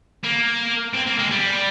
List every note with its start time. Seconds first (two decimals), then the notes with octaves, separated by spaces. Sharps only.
0.24 A#3
0.94 C4
1.07 A#3
1.19 G#3
1.31 G3